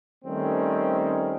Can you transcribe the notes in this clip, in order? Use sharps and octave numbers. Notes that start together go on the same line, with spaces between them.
D#3 G3 A3 C4 C#4